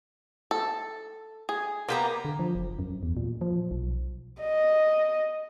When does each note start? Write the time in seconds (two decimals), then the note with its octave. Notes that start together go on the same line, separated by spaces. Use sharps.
0.51 A4
1.49 G#4
1.88 A#3 B3 G4 A#5
2.25 D3
2.39 F3
2.55 F#1
2.79 F#2
3.03 E2
3.17 A#2
3.41 F3
3.71 B1
4.42 D#5